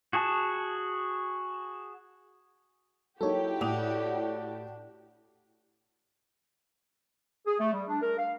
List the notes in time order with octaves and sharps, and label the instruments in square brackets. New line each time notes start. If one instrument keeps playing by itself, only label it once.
[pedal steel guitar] F#4 G#4 A5
[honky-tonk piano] F#3 A#3 D#4 [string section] E4 F#4 G4 [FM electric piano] A4 C#5
[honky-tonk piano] A2 D#6 F7 [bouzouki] D4
[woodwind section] G#4
A3
G3
D4
A#4
F5